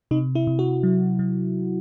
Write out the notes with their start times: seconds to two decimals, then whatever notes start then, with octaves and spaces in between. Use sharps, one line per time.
0.11 C3 D#4
0.35 E4
0.47 C3
0.59 F#4
0.83 F#3
1.19 F#3